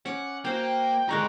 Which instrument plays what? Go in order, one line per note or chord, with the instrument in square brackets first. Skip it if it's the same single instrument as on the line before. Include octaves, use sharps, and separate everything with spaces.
[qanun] C#4 D6 [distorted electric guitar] F#5
[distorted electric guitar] A#3 [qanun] F#4 C5 F5 [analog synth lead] G5
[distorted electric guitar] G#2 G4 [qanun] D3 G#3 A#4 [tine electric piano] A#5 C#6 F#6